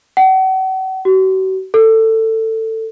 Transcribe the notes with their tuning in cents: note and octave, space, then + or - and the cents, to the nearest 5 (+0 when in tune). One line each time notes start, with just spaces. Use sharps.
F#5 +40
F#4 +40
A4 +20